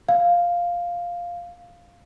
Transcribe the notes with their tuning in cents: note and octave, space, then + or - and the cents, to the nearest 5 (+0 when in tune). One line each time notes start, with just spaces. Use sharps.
F5 +0